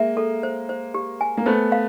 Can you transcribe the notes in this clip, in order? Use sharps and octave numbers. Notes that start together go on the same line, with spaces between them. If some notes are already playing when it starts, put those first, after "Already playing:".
Already playing: G#3 A#3 E5
A4
C5
C5
G4
G#5
A#3
A3 B3 C5
F5